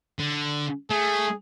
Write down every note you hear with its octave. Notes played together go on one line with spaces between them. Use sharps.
D3
A3 G#4